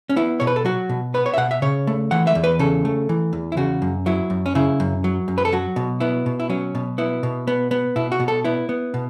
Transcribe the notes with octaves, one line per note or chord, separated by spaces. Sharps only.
C#4
B3 E4
B2 C#5
B4
A4
F#3 F#4
B2
B3 B4
C#5
E5
B2 F#5
E5
C#3 C#5
A3
E3 F#5
E5
E2
B4
C#3 A4
A3
E3
E2
E4
C#3 F#4
F#2
F#3 E4
F#2
C#4
C#3 E4
F#2
F#3
F#2
B4
A4
F#3 F#4
B2
B3 E4
B2
E4
F#3 C#4
B2
B3 E4
B2
B3
B3
B2 E4
F#4
B2
A4
B3 E4
B3
B2